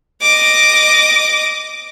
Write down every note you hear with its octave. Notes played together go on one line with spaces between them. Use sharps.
D#5 D6